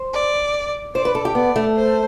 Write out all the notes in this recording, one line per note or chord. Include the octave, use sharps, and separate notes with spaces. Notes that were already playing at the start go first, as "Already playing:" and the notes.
Already playing: C5
D5
C5 D5
B4
A4
G4
B3 D5
A3
C5